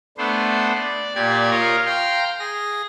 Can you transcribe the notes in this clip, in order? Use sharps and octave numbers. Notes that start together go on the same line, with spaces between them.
A3 B3 D4 C5
D5
A#2 G4 D5 G#6
F4 A#4 C#5 D#5 F5
F5 G5 A#5 C6
G#4 A#6